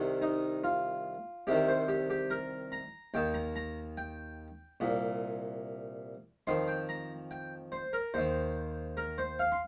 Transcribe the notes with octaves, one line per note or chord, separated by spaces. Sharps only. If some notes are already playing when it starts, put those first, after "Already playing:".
Already playing: C2 C3 D#3
D#4
F4
C2 C3 D#3 G4
C5
G4
G4
A#4
A#5
D#2 D#3 G5
A#5
A#5
G5
C2 A#2
F2 D#3 C6
G5
A#5
G5
C5
A#4
D#2 D#3 C5
A#4
C5
F5
C6